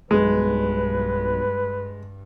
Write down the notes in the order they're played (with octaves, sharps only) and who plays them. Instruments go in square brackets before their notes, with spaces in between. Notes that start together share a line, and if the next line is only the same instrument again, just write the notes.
[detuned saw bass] B1 [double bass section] G2 [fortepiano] G#3 [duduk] B4